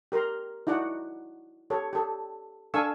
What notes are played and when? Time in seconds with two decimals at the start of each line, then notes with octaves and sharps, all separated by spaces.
0.12 G4 A#4 A#5 C6
0.67 D#4 E4 F#4 D5 F#5
1.70 G4 A4 C#5
1.93 G4 A4
2.74 D4 A4 F5 G#5 C#6 E6